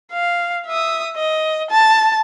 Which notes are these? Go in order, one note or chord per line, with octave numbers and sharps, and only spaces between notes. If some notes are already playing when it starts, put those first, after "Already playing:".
F5
E5 D#6
D#5
A5